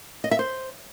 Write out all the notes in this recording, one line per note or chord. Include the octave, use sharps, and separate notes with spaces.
D#5
E5
C5